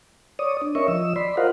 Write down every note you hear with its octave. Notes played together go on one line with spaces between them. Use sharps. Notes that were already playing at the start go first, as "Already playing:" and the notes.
C#5 D5 D#6
D4
C#4 A#4 C#5 D#5 E5 C#6
F3 D#5 E6
D5 B5 C6
F4 A#4 C5 D#5 F5 F#5